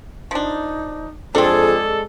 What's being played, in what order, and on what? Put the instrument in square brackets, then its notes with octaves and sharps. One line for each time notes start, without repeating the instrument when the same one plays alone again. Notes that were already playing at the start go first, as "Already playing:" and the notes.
[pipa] F3 D4 [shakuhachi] D#4
[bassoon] F2 [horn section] G#3 A4 [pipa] C4 D4 [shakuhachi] G#4